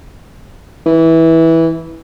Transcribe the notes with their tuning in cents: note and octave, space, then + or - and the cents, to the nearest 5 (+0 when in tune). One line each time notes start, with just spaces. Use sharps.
E3 -15